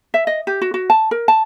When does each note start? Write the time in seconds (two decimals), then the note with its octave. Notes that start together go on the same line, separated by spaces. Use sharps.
0.14 E5
0.27 D#5
0.47 G4
0.62 F#4
0.74 F#4
0.90 A5
1.11 A#4
1.28 A5